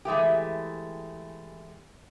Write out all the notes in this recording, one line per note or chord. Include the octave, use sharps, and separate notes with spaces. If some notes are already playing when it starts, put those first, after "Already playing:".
E3 G#3 A3 G4